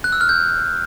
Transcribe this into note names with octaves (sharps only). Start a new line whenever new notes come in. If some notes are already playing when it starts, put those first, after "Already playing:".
F#6
E6
F6
G6